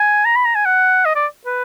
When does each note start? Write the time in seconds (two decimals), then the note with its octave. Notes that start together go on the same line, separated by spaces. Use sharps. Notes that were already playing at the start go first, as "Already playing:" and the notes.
Already playing: G#5
0.25 A#5
0.36 B5
0.45 A#5
0.55 G#5
0.66 F#5
1.05 D#5
1.16 D5
1.46 B4